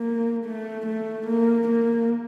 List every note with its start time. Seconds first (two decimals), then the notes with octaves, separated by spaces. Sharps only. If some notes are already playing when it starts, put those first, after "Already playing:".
Already playing: A#3
0.46 A3
0.87 A3
1.27 A#3
1.69 A#3